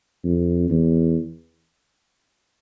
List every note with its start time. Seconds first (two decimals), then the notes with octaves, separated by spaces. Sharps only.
0.24 F2
0.70 E2